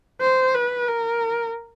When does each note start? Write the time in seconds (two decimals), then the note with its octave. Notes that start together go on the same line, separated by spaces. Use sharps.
0.21 C5
0.54 B4
0.87 A#4